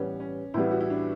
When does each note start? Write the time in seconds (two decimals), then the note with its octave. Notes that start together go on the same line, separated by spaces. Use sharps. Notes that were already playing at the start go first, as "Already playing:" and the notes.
Already playing: A2 E3 G3 B3 C#4
0.20 C#4
0.54 A2 E3 G3 B3 E4
0.71 F#4
0.81 E4
0.90 D4